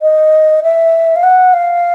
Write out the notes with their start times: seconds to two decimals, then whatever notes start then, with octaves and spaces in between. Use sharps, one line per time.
0.01 D#5
0.63 E5
1.16 F5
1.23 F#5
1.53 F5